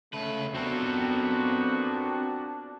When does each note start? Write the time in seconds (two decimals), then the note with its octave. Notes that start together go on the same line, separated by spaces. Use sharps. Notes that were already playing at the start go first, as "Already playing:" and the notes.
0.13 C#2 A3 B4
0.55 A#2 B3 C4 D4 F#4 A4